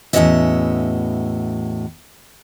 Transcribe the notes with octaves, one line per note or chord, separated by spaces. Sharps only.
E2 A2 C#4 F#4 D#5 E5